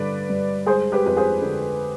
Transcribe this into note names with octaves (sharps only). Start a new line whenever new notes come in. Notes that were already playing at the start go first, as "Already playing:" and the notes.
Already playing: G2 D3 B4 D5
G2
G#3 G#4 C5
G4 B4
F2 B4
G#4 C5
D3